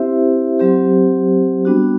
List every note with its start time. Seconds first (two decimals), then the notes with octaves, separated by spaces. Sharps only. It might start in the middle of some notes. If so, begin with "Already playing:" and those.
Already playing: C4 E4 G4 C5 E5
0.59 F#3 C4 G4 C5
1.65 G3 B3 D4 F#4